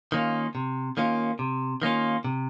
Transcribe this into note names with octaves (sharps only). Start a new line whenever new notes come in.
D#3 A#3 C#4 F4
C3
D#3 A#3 C#4 F4
C3
D#3 A#3 C#4 F4
C3